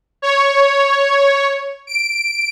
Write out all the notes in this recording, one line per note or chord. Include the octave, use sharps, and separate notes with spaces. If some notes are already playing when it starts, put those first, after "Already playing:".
C#5
D7